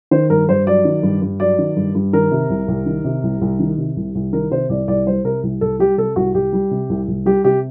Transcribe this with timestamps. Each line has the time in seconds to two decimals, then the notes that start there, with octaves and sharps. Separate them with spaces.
0.11 D#3 C5
0.30 G2 A#4
0.48 G2 C5
0.67 F#3 D5
0.85 D#3
1.03 G2
1.22 G2
1.40 F#3 D5
1.59 D#3
1.76 G2
1.95 G2
2.13 D#3 A#4
2.31 C3
2.50 C2
2.68 C2
2.86 D#3
3.04 C3
3.23 C2
3.41 C2
3.60 D#3
3.78 C3
3.96 C2
4.15 C2
4.33 D#3 A#4
4.51 C3 C5
4.69 C2 D5
4.88 C2 D5
5.07 G3 C5
5.24 C3 A#4
5.43 C2
5.61 C2 A4
5.79 G3 G4
5.98 C3 A4
6.16 C2 F#4
6.34 C2 G4
6.53 G3
6.71 C3
6.89 C2
7.08 C2
7.26 G3 G4
7.44 C3 G4